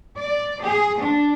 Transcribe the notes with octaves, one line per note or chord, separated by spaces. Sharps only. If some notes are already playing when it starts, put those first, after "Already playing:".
D5
G#4
D4